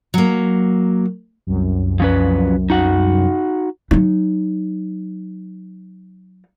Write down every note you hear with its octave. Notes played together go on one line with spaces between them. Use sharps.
F#3 A#3
C2 F#2
F3 C#4 B4
D#4 F#4 F#5
F#3 D#4